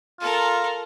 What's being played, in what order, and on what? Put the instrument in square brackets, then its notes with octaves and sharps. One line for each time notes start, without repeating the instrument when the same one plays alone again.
[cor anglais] F4 [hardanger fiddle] A4 A#4